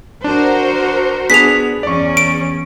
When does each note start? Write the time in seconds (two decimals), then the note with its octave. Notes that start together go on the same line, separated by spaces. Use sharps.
0.24 D4 F#4 A#4 C5
1.30 B3 D4 G#4 B6 F7
1.83 E2 C#4 D5 C#6
2.17 D7